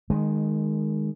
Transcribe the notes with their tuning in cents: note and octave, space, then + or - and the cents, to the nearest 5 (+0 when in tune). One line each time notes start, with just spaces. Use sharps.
D#3 -15 G#3 +0